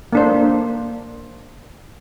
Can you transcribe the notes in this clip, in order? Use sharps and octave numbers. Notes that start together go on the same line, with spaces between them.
A#3 D4 C5